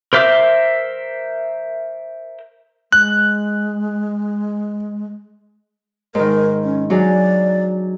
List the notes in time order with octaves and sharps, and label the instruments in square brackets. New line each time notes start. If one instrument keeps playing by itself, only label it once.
[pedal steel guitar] A#4 C5 E5 D6
[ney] G#3 [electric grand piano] F#6
[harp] G#2 D#3 [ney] A#4
[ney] C#4
[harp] F#3 D4 G#4 [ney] D5